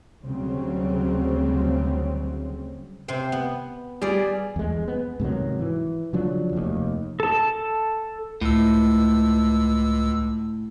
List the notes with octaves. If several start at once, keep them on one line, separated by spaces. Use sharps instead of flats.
D2 C#3 F#3 G3 C4
C3 C4 C5
B3
G3 G#4 D5
E2 G#3
B3
G#2 C3 D#3 F#3
E3
C#3 F3 F#3 D4
F1 D#2
A4 A5
C#2 A2 E6